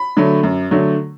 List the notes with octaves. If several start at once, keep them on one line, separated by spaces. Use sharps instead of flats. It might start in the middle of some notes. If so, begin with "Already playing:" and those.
Already playing: B5
D3 F#3 A3
F#2
D3 F#3 A3